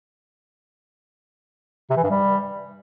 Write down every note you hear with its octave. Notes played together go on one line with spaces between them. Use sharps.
C3
E3
G2
G3